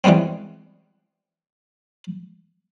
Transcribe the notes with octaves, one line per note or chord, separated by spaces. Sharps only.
E3 G3 G#3 B3 C4